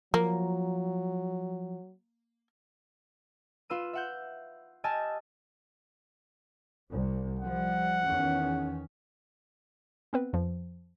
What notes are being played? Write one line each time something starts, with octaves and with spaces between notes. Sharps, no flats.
F3 F#3 A#3
F4 B4 E6 D#7
E5 F#5 G6
G4 D#5 G#5 A5 E6 F6
C2
F3 G3 F#5
E2 D#3 C#4
B3 C4 B4
F2 F3